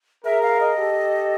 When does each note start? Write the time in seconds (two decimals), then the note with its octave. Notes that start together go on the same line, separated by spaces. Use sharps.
0.25 G#4 A#4 E5
0.43 F5
0.61 D#5
0.77 G4 A4